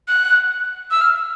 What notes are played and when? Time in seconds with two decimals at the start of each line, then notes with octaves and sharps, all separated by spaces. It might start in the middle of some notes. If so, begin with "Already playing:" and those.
0.08 F#6
0.91 E6
1.01 F6